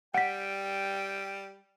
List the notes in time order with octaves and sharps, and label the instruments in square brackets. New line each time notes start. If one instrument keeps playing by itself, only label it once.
[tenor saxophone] G3 [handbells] F#5 B6 [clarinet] G5